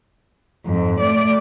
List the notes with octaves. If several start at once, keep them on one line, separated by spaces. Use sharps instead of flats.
F2 G#2
A3 D5